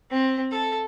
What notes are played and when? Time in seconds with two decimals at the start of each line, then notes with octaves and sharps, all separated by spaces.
0.11 C4
0.51 A4